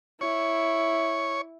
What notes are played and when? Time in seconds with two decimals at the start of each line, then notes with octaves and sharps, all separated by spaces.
0.21 E4 C#5